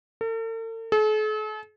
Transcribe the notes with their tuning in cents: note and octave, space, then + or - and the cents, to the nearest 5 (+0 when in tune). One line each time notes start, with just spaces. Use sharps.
A4 +45
A4 -45